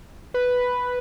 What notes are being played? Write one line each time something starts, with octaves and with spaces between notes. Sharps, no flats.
B4